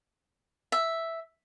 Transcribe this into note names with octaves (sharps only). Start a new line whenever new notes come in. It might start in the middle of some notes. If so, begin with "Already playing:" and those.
E5